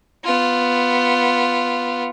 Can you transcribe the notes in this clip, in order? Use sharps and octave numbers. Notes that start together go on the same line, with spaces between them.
B3 F4